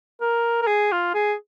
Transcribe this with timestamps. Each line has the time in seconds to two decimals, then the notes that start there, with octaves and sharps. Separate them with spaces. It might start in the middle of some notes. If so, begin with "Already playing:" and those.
0.21 A#4
0.62 A#4
0.67 G#4
0.92 F4
1.14 G#4